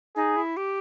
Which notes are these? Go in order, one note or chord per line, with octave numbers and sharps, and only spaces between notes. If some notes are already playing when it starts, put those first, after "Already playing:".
D#4 G#4
E4
G4